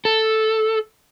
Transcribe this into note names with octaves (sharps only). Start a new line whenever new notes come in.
A4